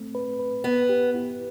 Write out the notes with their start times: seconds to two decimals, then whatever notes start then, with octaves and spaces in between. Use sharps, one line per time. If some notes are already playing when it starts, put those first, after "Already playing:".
Already playing: A3 C4
0.15 B4
0.39 B4
0.64 B3 B4
0.89 G4
1.15 E4